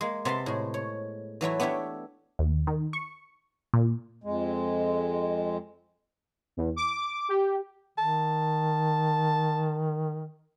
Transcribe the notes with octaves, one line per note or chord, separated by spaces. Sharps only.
G#3 A#3
C3 B3 A5 C6
A2 G#3
C#5
E3 F#3 A3 E4
B3 D4 E4 G4 C#5
D#2
D#3
C#6
A#2
F2 G#3
E2
D6
G4
D#3 A5